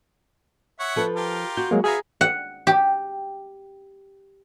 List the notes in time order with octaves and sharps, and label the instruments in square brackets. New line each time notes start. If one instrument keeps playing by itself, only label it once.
[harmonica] C#5 E5 F#5
[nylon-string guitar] F3 A4 B4
[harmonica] F4 G4 A#4
[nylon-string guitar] F#4 [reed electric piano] G6
[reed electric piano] F#3 G#3 A#3
[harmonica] B3 E5 F5 [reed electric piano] G#4 G#5 A#5
[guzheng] F#5
G4